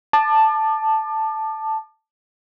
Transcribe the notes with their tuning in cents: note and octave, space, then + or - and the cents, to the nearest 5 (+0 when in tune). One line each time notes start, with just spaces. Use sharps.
A5 +0 D6 +35